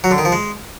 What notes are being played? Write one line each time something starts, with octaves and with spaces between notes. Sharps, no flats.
F#3
D3
D#3
F3
G#3